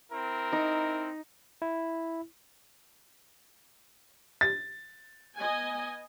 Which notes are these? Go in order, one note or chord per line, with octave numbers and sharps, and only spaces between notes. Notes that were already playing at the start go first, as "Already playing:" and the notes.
C4 E4 A#4
D#4
E4
A6
B3 D#5 G#5